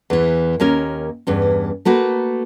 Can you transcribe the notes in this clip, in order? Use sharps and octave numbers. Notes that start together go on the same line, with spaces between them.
E2 E3
D#2 A#3 C#4 A#4
E2 G2 C#4
A3 A#3 F#4 B4